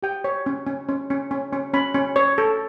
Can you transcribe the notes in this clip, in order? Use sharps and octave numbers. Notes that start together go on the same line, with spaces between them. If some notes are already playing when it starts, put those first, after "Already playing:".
G4 G5
C#5
C#4
C#4
C#4
C#4
C#4
C#4
C#4 B5
C#4
C#5
A4